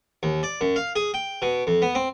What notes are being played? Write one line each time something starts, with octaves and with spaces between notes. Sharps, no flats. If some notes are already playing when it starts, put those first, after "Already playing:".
D#2
D5
F#2
F5
G#4
G5
B2
F2
B3
C4